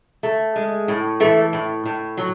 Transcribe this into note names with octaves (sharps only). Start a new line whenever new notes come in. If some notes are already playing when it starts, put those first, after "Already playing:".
A3
G#3
A2
E3 A3
A2
A2
F#3